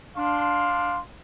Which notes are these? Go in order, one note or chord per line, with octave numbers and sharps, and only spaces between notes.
D4 F5 C6